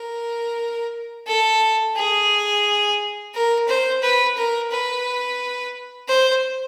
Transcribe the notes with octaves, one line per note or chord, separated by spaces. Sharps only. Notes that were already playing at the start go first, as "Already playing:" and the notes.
Already playing: A#4
A4
G#4
A#4
C5
B4
A#4
B4
C5